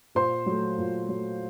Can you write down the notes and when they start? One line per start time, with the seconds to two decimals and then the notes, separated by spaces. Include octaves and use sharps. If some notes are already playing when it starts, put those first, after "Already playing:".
0.15 A#2 C5 C6
0.46 F#3 A3
0.78 A#2
1.09 F#3 A3